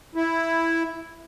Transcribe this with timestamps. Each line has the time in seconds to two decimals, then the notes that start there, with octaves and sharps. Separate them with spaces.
0.15 E4